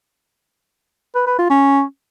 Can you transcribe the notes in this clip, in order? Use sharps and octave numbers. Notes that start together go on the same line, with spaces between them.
B4
B4
F4
C#4